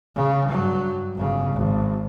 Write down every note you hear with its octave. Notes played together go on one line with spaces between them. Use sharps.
C#3
G2 F#3
G1 C#3
G#1